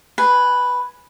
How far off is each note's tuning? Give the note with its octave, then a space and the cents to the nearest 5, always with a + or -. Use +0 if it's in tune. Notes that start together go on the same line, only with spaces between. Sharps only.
B4 +0 G#5 +0